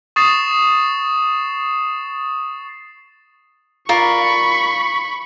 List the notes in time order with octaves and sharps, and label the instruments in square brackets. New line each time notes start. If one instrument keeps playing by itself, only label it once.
[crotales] C#6 D#6 A6 C7 E7
[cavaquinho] F4 A#4 D5 [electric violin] B5 C#6